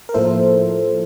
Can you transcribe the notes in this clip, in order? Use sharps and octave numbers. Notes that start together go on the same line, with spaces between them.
A#4
A2 F3 A#3 E4 A4 C5